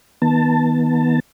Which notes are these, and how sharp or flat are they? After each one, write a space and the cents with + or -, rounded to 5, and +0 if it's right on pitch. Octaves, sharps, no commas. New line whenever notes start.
D#3 +25 B3 -20 A5 +15